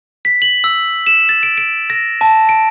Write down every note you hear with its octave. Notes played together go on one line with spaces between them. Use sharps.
B6
F#7
E6
E7
A6
D7
D7
A#6
A5
D7